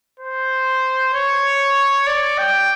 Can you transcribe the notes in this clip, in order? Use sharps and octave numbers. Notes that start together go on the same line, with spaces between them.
C5
C#5
D5
G5